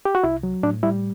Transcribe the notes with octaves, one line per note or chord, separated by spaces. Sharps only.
G4
F#4
C2 E4
F#3
A2 D4
G3 E4